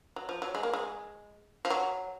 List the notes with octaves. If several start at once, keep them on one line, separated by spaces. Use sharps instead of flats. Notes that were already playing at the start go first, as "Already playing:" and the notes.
F#3
F3
F#3
G#3
A#3
G#3
F3
F#3